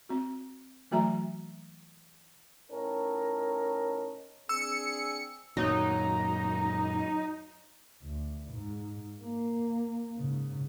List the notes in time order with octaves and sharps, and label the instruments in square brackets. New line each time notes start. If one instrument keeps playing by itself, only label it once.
[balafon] C4 F#4
E3 F#3 A3 F#4 E5 A#5
[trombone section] A2 C#4 D#4 A4 A#4
[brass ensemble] C4 D4 G#4 [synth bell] E6 [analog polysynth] C#7
[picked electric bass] F#2 A#2 D#3 [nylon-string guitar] F#3 [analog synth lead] D#4
[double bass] D2
G#2
A#3
G#2 C#3